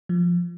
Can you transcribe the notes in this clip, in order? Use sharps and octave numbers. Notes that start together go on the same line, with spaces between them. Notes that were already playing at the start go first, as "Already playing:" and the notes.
F3